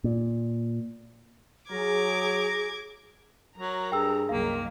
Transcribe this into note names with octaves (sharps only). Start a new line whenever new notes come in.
A#2
F#3 G#4 A#5 D6 G#6
F#3 A#4 A#5
G2 G#4 G5 E6
C2 F#2 D#3 A#3 F5